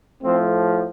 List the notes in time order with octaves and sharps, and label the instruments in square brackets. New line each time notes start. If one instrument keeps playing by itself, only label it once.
[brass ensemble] A2 F3 A3 C4